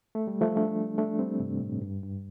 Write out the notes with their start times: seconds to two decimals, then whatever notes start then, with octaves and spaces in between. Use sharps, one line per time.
0.15 A3
0.27 G3
0.41 F3 A3
0.57 A3 D4
0.98 A3 D4
1.19 G3 C4
1.40 G2 C3
1.61 A2
1.82 G2
2.03 G2